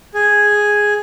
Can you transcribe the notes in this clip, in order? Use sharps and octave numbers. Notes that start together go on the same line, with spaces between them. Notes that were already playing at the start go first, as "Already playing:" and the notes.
G#4